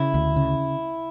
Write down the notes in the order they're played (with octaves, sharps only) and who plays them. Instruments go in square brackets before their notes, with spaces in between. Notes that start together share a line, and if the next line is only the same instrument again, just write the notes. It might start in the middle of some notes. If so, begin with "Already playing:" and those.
Already playing: [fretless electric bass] C#3 [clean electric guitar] E4
[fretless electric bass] D2
C#3